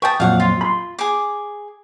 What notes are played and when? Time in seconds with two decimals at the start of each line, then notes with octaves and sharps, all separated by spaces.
0.02 B4 G5 A5 C#6 D#6
0.20 F2 A#2 F#3 F5 F#5
0.40 F4
0.61 B5 C6
0.99 G#4 D6